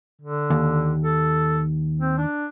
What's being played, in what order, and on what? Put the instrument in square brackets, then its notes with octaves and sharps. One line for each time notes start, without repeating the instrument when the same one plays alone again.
[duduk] D3
[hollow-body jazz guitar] D#2
[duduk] A4
C4
D4